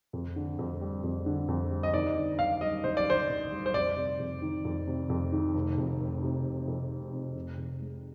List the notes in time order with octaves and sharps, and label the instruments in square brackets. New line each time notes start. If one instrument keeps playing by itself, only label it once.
[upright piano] F2
D3
F2
G3
F2
D3
F2
G3
[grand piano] D#5
[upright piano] D#2 [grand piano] D5
[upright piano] D3
[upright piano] D#2 [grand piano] F5
[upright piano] G3 [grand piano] D#5
[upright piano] D#2 [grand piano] C5
[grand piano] D5
[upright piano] D3 [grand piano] C5
[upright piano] D#2
G3
[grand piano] C5
[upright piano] F2 [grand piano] D5
[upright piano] C3
F2
D#3
F2
C3
F2
D#3
F1
F2
F1
C3
F1
F2
F1
C3
F1
F2
G#3